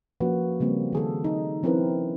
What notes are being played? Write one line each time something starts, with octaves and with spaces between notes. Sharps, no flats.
F3 A#3 C#4 F#4 B4
C#3 G3 A#3 C4
D#3 G#4 A4
D#4
F3 C4 C#4 E4 A#4 B4